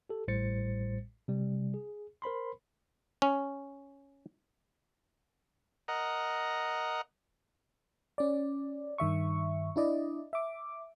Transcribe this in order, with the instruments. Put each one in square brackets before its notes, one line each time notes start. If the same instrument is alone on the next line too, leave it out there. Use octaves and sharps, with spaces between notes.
[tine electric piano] G4 A4
A1 A2 G3 C5 A6 C#7
C3 G3
G#4
A#4 C5 B5 C6
[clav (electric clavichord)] C#4
[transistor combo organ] A#4 D#5 F#5
[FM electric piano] C#4 D5
G2 D#3 E5 C#6
D4 E4 D5 D#5
E5 D6